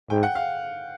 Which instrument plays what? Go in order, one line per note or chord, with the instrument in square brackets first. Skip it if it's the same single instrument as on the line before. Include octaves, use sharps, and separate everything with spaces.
[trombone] G#2 [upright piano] G5
[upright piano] F#5
F5